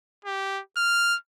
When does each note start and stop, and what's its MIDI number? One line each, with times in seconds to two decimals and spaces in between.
0.25 0.60 67
0.77 1.17 89